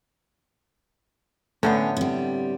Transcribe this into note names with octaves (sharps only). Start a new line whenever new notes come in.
A2 D3 B3 C#4
C3 G3